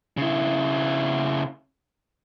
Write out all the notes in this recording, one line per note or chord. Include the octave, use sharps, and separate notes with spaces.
C#3 E4